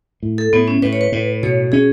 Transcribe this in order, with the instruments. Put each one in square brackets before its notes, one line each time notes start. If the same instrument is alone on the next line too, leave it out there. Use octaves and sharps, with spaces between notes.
[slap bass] A2
[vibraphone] A4
[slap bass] A2 [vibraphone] B3
[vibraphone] C#4
[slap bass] A2 [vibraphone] B4
[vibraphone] C#5
B4
[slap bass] A2
[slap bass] B2 [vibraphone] C#5
[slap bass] C#4 [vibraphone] G#4